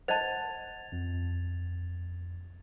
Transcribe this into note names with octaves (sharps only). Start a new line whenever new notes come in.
C5 D#5 F#5 A5 G#6 A6 F7
F2